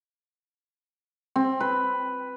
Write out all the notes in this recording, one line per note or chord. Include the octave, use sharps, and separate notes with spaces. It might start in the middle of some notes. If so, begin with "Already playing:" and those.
C4
B4